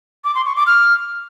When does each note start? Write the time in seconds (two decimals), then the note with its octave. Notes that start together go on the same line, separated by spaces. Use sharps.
0.24 D6
0.35 C6
0.46 C#6
0.56 D6
0.67 F6